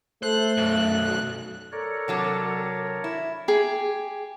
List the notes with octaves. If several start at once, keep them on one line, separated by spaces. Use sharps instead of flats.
A3 A4 C5 F#6
B1 F#2
A4 A#4 C#5 D5
C3 F#3 D4
E4
G4 G#4